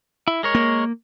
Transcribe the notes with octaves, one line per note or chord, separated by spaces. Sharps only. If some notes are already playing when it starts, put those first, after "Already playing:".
E4
G#3 A#4 C#5
A#3